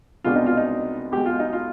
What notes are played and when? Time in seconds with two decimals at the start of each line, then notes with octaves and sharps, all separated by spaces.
0.24 C2 B2 G#3 B3 D4 F4
0.36 D#4
0.46 F4
0.57 D#4
1.12 B1 B2 G#3 G4
1.26 F4
1.40 D#4
1.53 F4